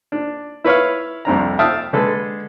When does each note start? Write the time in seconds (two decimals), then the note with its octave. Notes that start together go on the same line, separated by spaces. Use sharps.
0.12 D4
0.64 E4 B4 C#5 F5
1.25 C2 F2 D4 A#5
1.59 E5 F5 G5 A5 D#6
1.93 D3 G#3 A4 B4